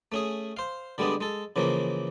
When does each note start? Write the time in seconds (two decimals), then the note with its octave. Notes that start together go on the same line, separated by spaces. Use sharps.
0.12 A3 C#4 G#4
0.57 C5 F5
0.98 D3 G3 G#3 B3 D4
1.21 G#3 A4
1.56 C#3 E3 F3 A#3